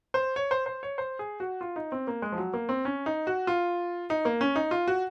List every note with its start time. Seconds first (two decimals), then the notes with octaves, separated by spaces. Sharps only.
0.14 C5
0.36 C#5
0.51 C5
0.66 C5
0.83 C#5
0.98 C5
1.19 G#4
1.40 F#4
1.61 F4
1.76 D#4
1.92 C4
2.07 A#3
2.22 G#3
2.32 F3
2.38 F#3
2.54 A#3
2.69 C4
2.85 C#4
3.06 D#4
3.27 F#4
3.47 F4
4.10 D#4
4.25 A#3
4.41 C#4
4.56 D#4
4.71 F4
4.88 F#4